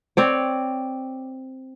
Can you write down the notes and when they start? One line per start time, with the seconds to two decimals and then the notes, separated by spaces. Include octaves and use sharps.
0.17 C4 C#5 D5